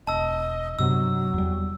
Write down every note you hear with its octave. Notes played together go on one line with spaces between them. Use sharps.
E1 D#5 A5 E6
G2 C3 F#3 B3 E6
E2 G3